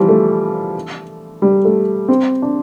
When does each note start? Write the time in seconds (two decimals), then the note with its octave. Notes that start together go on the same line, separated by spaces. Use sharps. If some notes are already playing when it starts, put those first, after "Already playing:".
Already playing: E3 F3 G3
0.09 A3
1.42 G3
1.65 A3
2.08 C4
2.42 D4